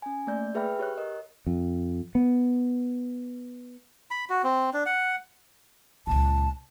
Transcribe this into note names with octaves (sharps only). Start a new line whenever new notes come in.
C#4 G#5
A3 A#3 D5 G6
G#4 B4 E5 G5 B5 F6
G4 C#5 F#6
A#4 D#5
F2
B3
B5
F#4
C4
D4
F#5
C#2 A#2 A5